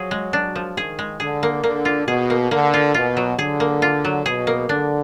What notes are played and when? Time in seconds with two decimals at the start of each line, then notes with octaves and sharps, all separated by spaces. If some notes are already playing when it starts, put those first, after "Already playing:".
Already playing: F3 F#3 G#4
0.11 G#3
0.33 D4
0.56 F3
0.77 D#3 G#4
0.99 G#3
1.20 D3 G#4
1.43 A#3
1.63 D3 A#3
1.85 F4
2.08 B2 G#4
2.30 A#3
2.51 D3 A#3
2.74 F4
2.94 B2 F4
3.17 F#3
3.38 D3 G#4
3.60 A#3
3.82 F4
4.05 F#3
4.26 B2 G#4
4.47 A#3
4.69 D3 D4